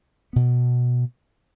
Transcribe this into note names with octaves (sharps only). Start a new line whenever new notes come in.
B2 B3